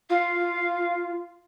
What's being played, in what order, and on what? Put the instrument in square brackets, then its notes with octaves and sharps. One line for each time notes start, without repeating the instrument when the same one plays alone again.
[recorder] F4 [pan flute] F5